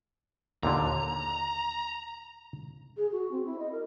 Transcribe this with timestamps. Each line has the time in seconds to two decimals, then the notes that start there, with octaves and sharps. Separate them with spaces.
0.63 D#2 A#2 D3 A#5
2.97 G#4
3.12 F#4
3.32 C4
3.46 E4
3.59 D#5
3.72 A#4